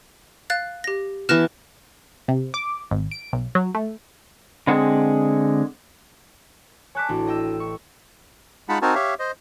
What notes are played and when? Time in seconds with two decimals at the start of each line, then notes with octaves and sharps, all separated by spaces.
0.50 F5 F#6 A6
0.84 G4 A#6
1.29 E3 B3 A5 F6 F#6 A#6
2.28 C3
2.54 D6
2.91 G#1
3.11 D7
3.33 B1
3.55 F#3
3.75 A3
4.67 D3 G#3 C4 G#4 F#5
6.95 C#5 G#5 A5 D6 F#6 B6
7.09 A1 D4 E4 F#4
7.27 D#5 G5 E6
7.60 C#6
8.69 G#3 D#4 F4 F#5 A5 B5
8.82 C4 D#4 F#4 A#4 G#5 A5
8.95 G4 C#5 E5 F5
9.19 C5 D#5